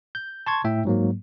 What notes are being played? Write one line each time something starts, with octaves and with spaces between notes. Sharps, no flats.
G6
A5 C6 C#6 G#6
A2 E5 G5
G#2 F#3 A#3